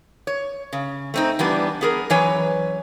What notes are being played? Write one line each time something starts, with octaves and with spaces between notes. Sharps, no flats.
C#5
C#3
A3 C4 D#4
E3 G3 B3 D4
B3 G#4 A#4
F#2 E3 B4 C#5 G#5